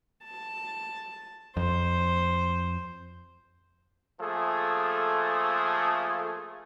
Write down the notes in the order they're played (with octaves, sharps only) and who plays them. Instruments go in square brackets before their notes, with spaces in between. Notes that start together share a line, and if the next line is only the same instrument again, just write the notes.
[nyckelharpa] A5
[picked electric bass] F2 [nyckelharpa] C5
[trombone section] F3 A3 A#3 G#4 A4